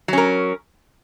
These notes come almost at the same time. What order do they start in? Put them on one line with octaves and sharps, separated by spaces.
F#3 C#4 A#4